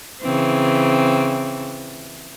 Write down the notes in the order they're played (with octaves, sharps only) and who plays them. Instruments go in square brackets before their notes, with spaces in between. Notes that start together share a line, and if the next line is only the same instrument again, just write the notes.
[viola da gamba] C#3 E3 C4